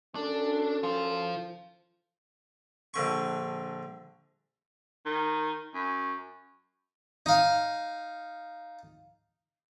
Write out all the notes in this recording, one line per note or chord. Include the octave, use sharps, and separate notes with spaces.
F#2 C#4 D4 A4
F4 C5
A#1 D3 C#6
D#3
F#2
D#4 F5